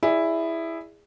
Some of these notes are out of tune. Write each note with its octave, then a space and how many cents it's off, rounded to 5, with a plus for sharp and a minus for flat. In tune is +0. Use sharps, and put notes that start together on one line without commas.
E4 +0 G#4 -15 D5 +25